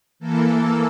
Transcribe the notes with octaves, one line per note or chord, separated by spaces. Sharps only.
E3 A#3 A4